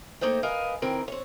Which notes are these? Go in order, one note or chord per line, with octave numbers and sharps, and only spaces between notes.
A3 A#3 D#4 C5 G5
A#4 B4 D#5 F5 G#5
D#3 E3 C4 A#4
C4 C#5